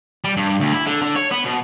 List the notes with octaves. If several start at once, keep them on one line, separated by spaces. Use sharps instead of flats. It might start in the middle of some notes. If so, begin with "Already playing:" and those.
G3
G2
D2
E4
D3
D3
C#5
B3
B2